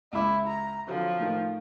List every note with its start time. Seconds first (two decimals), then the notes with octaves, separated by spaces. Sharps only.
0.13 C#2 E4 D6
0.47 A#5
0.88 D3 F3 F#3 C4
1.20 A2 D#3